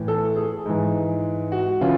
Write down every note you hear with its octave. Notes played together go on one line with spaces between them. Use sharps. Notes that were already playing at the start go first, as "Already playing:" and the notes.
Already playing: A2 E3
A4
G#4
G#2 E3
F#4
C#3 E3 F4